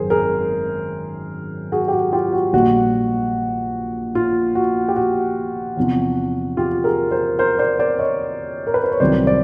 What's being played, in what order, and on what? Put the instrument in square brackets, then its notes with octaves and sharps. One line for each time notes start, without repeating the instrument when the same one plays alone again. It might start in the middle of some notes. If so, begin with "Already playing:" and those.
Already playing: [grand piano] G#1 F#2 D#3 G#4 A#4 C5
G#4 A#4
F#4 G#4
G4
F#4
F4 G4
F#4
A#1 A#2 G3 F#4
F4
F#4
G4
F#4
E2 C3 F3
F4 G4
G#4 A#4
A#4 C5
A#4 C5
C5 D5
C5 D5
C#5 D#5
A#4
B4
C5
C#5
C2 C3 D#3 F#3 C5 D5
C5 D5